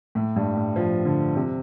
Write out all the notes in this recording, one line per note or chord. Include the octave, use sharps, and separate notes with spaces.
A2
G2
A2
F3
D3
C3